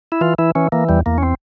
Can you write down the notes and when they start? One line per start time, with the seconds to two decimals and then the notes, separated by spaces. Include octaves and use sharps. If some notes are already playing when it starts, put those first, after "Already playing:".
0.12 E4
0.21 E3 F4
0.39 E3 E4
0.55 E3 C#4
0.72 E3 A#3
0.89 E2 G3
1.06 E2 A#3
1.18 C#4
1.23 C4